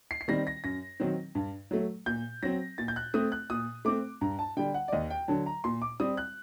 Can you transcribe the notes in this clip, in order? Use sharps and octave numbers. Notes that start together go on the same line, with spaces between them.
C7
C7
D#3 G3 C4 A#6
A#6
F#2 A#6
D#3 F#3 C4
G2
F#3 A3
A#2 G6
F#3 C4 A#6
A#2 A6
G6
F#6
A3 C4 D#6
F#6
A#2 D#6
A3 C4 D6
G2 A#5
A5
D3 G3 G5
F#5
D5
D#2 D#5
G5
D3 F#3 A5
A#5
A#2 C6
D6
G3 C4 D#6
F#6